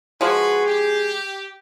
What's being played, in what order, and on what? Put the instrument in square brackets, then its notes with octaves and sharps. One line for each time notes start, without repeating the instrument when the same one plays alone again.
[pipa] F3 G#3 [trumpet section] F#4 B4 [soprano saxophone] G#4
[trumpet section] G4